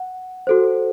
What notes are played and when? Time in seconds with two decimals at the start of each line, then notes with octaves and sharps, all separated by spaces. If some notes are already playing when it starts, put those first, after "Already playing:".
Already playing: F#5
0.47 F#4 A4 C5